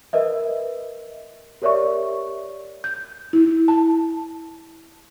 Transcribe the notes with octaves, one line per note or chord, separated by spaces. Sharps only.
A#4 B4 D#5 E5
G4 A#4 C#5 D5 E5 C#6
G6
E4
A5